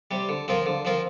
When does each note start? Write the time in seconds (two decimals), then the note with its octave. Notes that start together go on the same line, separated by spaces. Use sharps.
0.11 C3 G3
0.29 D3
0.48 F3 C4 F4 A#4
0.66 D3
0.85 F3 C4 F4 A#4